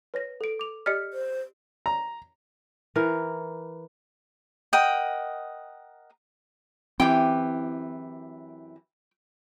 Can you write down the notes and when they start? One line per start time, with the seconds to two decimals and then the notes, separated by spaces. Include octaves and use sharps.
0.14 B4 C#5 A#6
0.41 A4 D7
0.59 D6 F7
0.86 G4 D5 D#5 F6 B6 C#7
1.13 C5
1.86 A#5
2.96 E3 A#4
4.73 A#4 D#5 F#5 G5
7.00 F#2 E3 C4 G4 G5